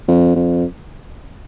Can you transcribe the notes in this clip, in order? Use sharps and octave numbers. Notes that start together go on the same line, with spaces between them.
F2
F2